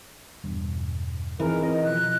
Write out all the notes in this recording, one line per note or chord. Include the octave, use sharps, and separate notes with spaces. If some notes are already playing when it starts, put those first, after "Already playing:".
E2 G2 B2
E3 C4 D#4 G#4 A#4
C4 D#5
B2 F3 F#6